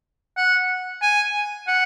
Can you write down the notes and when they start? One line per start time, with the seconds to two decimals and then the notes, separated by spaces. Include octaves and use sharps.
0.37 F#5
1.02 G#5
1.68 F#5